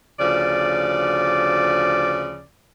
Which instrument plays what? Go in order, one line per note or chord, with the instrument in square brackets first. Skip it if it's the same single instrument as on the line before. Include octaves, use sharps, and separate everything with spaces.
[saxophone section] D2 C#3 F3 D5